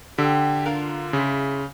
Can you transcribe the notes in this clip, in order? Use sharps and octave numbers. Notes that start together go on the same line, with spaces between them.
D3 G4 C5 E5 G5
D4 F4 A#4
C#3 E4 G#4 C5